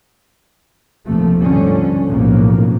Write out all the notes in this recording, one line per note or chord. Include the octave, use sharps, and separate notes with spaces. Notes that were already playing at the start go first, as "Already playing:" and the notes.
F1 D#2 C3 F3 A3
G#2 D3 F3 G3 C#4
B1 F2 A2 C#3 A#3